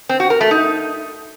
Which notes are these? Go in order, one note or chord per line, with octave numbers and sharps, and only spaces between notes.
C4
F#4
A#4
A3
D#4